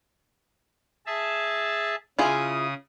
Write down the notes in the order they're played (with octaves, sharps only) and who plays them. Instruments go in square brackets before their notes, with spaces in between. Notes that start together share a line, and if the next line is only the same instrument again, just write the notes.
[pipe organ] G#4 E5 A5
[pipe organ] C#3 D#6 [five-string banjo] E4 F4 G#4